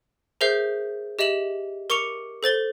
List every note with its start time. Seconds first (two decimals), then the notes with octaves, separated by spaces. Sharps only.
0.41 G#4 A#4 C5 E5 G6 C7
1.19 G4 D#5 E5 E7 F#7
1.90 A#4 C#6 D6 C#7 F7
2.43 A4 C5 A6 G7